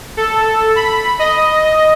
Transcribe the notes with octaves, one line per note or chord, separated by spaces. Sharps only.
A4
B5
D#5